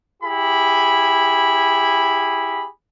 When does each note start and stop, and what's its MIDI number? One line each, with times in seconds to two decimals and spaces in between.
0.23 2.67 64
0.23 2.67 67
0.23 2.67 68
0.23 2.67 83